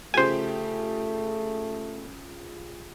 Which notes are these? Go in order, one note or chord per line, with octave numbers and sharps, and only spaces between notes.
C#3 F3 A3 G4 C5 G#5